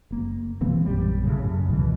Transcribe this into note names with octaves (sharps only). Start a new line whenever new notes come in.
F#1 A#3
B2 E3 A#3 C4
A#1 F#2 F3 G3
A2 C#3
F#2
C#2 B2 D#3 E3